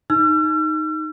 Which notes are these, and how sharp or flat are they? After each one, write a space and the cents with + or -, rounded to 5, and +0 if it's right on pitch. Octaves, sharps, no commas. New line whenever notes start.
D#4 +0 E6 +45